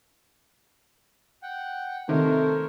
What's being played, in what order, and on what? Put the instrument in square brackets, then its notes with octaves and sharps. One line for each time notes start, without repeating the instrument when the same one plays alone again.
[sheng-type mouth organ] F#5 G5
[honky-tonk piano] C3 [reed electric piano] D#3 [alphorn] A3 [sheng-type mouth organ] A#4 C5 C#5